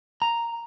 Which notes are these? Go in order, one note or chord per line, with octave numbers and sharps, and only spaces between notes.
A#5